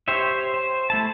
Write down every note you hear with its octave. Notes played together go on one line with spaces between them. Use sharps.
G4 C5 C#5 E5
C5
A3 E4 A5